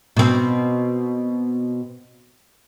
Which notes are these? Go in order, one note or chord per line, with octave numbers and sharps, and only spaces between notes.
B2 C4